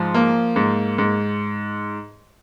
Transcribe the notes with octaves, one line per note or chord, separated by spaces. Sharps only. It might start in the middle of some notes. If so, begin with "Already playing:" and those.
Already playing: G#2 F3
A#3
G#2
G#2